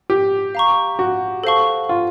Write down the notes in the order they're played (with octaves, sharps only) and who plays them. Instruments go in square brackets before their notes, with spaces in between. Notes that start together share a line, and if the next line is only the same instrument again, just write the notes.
[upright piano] G4
[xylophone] F5 A#5 C#6
[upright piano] F#4
[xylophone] A4 C5 F5 A5 C#6
[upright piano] F4